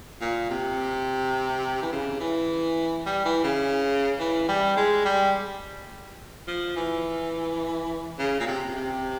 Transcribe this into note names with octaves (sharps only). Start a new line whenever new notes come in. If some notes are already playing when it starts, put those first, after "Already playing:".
A#2
C3
E3
C#3
E3
G3
E3
C#3
E3
G3
G#3
G3
F3
E3
C#3
A#2
C3
C3